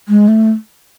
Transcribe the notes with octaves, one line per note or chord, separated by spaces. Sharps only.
G#3
A3